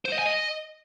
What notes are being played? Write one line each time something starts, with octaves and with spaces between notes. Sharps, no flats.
C5
D#5
G#5
D#5